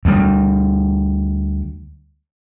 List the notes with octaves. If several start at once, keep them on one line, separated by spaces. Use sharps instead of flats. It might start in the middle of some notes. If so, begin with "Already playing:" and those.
D2 G3